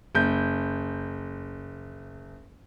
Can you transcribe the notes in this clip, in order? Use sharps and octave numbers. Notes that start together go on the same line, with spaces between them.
F#1 G6